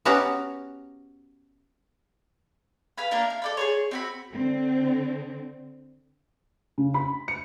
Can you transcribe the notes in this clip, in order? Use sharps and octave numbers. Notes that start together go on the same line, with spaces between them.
B3 C#4 F#4 G4 A#5
B4 F5 G#5 B5
A#3 D4 A#4
F5
A4 D5 B5
G#4 C5 C#5
C4 F#4 B5
D3 C4
C#3
B5
C#7